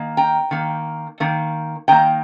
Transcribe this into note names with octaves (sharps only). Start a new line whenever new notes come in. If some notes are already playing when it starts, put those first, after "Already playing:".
Already playing: D#3 A#3
G5 A#5
D#3 A#3
D#3 A#3
D#3 A#3 G5 A#5